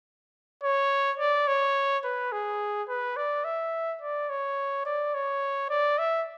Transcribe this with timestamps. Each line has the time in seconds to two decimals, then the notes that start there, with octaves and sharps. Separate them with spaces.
0.63 C#5
1.19 D5
1.48 C#5
2.04 B4
2.32 G#4
2.88 B4
3.17 D5
3.44 E5
4.02 D5
4.30 C#5
4.85 D5
5.14 C#5
5.70 D5
5.98 E5